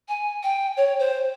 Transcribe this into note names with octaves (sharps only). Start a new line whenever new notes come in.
G#5
G5
C#5
C5